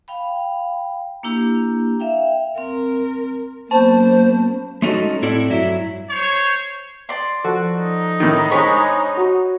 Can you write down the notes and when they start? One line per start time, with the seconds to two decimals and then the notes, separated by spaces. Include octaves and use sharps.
0.08 F5 G5 B5
1.23 A#3 D4 E4 G4
2.00 E5 F5 G5
2.58 C4 A#4
3.71 F#3 A#3 B3 C#4 C5 A5
4.82 G#3 A3 C#4 D#4 F#4 A4
5.22 A2 C4 E4 A4 D5
5.50 G2 F#3 E4
6.10 C5 C#5
7.09 D5 C6
7.44 F3 F#4 A4
7.79 D#4
8.20 A2 D#3
8.51 G#3 D4 C5 C#5 G#5 B5 C#6
9.18 F#4